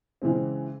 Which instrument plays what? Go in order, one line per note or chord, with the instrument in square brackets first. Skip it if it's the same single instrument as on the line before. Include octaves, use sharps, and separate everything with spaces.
[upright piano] C#3 E3 G#3 C4